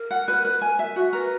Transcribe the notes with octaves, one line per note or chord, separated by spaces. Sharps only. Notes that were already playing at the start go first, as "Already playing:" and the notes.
Already playing: A#4
F#5
B4
B4
G#5
E5
F#4
A#4 B4